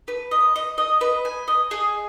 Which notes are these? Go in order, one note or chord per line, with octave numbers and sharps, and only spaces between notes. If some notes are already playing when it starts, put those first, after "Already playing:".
B4
D#5
D#5
D#5
B4
G#5
D#5
G#4